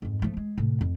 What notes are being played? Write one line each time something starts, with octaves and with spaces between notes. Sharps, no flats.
F2 G#2
F3 A3
G#3
A2 C3
F2